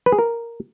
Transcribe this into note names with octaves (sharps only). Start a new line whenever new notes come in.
B4
G#4
A#4